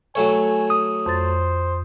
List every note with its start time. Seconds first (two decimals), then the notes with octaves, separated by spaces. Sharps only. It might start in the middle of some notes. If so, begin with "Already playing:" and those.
0.15 F#3 A3 C#5 G#5
0.70 D#6
1.06 F2 C5 A6